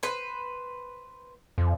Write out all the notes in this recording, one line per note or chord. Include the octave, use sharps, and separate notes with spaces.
B4 C5
F2